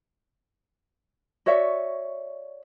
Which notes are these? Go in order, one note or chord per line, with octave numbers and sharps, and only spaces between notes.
F#4 C#5 D5 E5